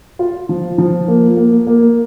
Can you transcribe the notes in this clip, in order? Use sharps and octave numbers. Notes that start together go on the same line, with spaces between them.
F4
F3
F3
A#3
A#3
A#3